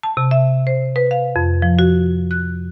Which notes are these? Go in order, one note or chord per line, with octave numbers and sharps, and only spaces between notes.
A5
C3
E5
C5
B4
F5
F2
F3
F#4
F#6